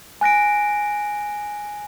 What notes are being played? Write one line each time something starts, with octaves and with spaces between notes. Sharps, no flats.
G#5 F#6 A#6 D7